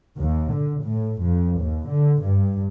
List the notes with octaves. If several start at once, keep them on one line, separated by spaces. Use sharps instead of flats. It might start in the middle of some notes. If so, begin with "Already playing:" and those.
D#2
D3
A2
F2
D#2
D3
G2